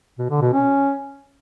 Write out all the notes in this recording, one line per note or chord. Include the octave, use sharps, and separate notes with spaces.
B2
D3
B2
C#4